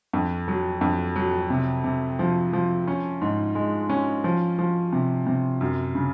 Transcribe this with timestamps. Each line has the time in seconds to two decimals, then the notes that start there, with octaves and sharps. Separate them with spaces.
0.13 F2
0.48 F#3
0.81 F2
1.16 F#3
1.50 C3
1.84 C3
2.19 F3
2.53 F3
2.87 C#4
3.21 G#2
3.55 G#3
3.90 C#4
4.24 F3
4.59 F3
4.93 C3
5.27 C3
5.61 F#2
5.95 C#3